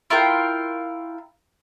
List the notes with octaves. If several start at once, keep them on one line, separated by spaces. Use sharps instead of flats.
E4 F4 A#4 G5